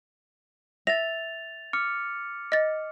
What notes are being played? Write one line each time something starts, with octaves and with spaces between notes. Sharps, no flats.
E5 A6 A#6 F7
D6 F6 C#7
D#5 A6